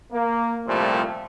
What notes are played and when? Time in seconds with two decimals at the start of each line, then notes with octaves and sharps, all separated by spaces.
0.12 A#3
0.67 C2 A#2 F3 G3 A3